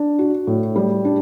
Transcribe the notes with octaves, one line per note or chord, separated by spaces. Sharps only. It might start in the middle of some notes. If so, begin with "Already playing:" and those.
Already playing: D4
F#4
A2
G3
D4